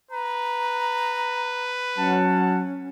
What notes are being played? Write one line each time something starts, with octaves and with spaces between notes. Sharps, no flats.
B4 A#5
F#3 C#4 F#5 A5